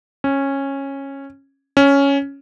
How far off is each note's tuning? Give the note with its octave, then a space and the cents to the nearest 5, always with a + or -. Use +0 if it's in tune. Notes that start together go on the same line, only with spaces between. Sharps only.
C#4 -15
C#4 +5